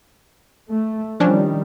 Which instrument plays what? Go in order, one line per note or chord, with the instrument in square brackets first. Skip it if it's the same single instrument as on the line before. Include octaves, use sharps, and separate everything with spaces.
[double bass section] A3
[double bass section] D#3 G3 [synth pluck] F3 C#4 D4